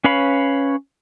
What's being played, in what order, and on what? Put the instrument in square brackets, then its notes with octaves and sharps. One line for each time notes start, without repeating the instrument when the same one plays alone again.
[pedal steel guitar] C#4 B4 C#5 F5 B5